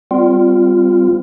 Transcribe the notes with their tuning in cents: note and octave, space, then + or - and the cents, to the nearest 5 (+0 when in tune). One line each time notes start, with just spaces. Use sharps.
G3 +0 C4 -35 F4 +0